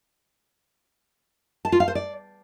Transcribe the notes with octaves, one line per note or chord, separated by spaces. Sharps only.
A5
F4
F5
C5
D5